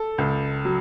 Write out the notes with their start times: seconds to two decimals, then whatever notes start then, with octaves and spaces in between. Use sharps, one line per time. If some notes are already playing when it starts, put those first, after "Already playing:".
Already playing: A4
0.18 C#2
0.65 F#3